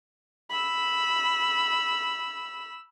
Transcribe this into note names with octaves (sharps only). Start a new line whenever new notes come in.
B5 E6